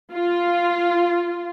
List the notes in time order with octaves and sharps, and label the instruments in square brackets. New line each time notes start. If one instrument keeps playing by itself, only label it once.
[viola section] F4